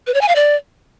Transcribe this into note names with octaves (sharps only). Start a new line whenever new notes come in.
B4
C#5
G#5
F5
D5